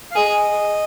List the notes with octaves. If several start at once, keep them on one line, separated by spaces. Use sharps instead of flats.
F5
G#4 D#5